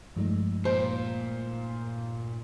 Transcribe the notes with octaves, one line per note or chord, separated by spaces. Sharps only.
G2 F3 G#3 A3 D#4
A#2 C5